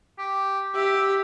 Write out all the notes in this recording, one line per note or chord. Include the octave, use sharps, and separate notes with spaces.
G4
G4 E5